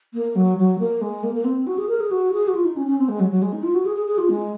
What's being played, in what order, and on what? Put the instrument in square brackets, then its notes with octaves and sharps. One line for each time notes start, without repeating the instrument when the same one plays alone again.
[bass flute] A#3
F#3
F#3
A#3
G#3
A#3
A#3
C4
F#4
G#4
A#4
G#4
F#4
G#4
F#4
F4
D#4
C#4
C#4
C4
G#3
F#3
F#3
G#3
D#4
F4
F#4
G#4
G#4
G#4
F4
G#3